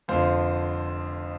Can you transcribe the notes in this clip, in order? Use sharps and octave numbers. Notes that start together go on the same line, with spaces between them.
F1 F2 D3 C5 F5